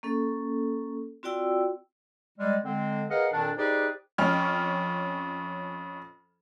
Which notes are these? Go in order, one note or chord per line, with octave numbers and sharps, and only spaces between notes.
A#3 C#4 A4
C4 F4 F#4 D5 G5 E6
G3 G#3
D3 G#3 C4
G#4 A#4 B4 D#5 F5 F#5
F2 A#2 D#3 D4
D#4 G4 G#4 B4 C5 D5
F2 C#4 G5 F6